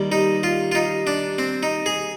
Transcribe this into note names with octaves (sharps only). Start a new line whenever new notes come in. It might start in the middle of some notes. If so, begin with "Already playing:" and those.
Already playing: D#2 D#3 G3
D#4
F4
F4
D#4
D4
C4
D#4
G#4